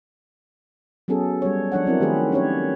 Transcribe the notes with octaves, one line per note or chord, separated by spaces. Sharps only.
F#3 B3 C#4 G#4 A4
G3 C#5
F3 D4 C#5 F#5
F#3 C4 E4 A#4
D#3 A3 G4 G#4 B4
C#4 G4 B4 C#5